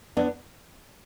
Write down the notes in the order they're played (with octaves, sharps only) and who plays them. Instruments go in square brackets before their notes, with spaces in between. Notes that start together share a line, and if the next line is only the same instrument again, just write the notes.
[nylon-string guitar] B3 D4